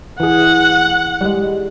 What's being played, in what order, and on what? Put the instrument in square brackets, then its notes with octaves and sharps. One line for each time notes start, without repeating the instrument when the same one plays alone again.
[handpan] E3 G#4 [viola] F#5
[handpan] G3 G#3